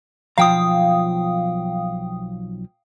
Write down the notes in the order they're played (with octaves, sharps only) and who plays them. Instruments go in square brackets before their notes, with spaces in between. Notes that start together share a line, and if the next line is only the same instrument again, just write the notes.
[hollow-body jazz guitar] B1 F3 A#5 [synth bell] F5 G5 D#6